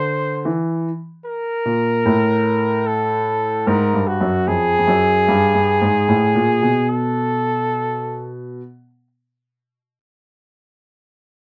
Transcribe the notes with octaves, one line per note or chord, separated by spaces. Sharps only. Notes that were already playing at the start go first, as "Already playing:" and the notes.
Already playing: D3 C5
E3
A#4
A#2
A2
A4
G#2 A#4
G2
F#4
F#2
F2 G#4
F2
F#2
G2
G2
G#2
A2
A#2
B2
A4